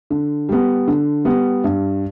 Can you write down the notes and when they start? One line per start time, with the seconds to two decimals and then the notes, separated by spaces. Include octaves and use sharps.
0.10 D3
0.49 G3 B3
0.88 D3
1.25 G3 B3
1.64 G2